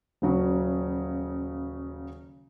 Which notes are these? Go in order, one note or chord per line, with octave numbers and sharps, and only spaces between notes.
D#1 C#3 F#3